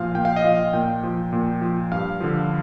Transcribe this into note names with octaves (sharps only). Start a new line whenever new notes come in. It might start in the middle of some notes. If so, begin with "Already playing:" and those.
Already playing: A#2 F3 F5
A#2 G5
F5
D#5
F3 F5
A#2 G5
F3
A#2
F3
G2 F5
D3 F3